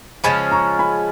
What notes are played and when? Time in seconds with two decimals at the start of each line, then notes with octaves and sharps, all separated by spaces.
0.24 C#3 F3 G#3 C#4 G#5 B5
0.51 A#5 C#6
0.79 G#5 B5